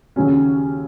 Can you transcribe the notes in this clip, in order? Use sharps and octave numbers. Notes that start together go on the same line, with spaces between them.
D#2 C#3 F#3 C#4